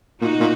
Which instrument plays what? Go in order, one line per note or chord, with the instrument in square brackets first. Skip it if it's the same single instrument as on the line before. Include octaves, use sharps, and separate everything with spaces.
[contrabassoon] A#2 [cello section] D#4 F#4
[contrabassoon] A#2